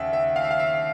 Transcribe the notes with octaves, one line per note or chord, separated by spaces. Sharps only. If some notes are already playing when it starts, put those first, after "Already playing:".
Already playing: D#2 C#3 E5 F#5 G5
E5
F5
E5
F5
E5